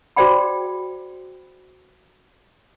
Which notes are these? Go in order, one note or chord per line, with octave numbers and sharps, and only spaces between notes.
F#4 G#4 C5 D5 G5 B5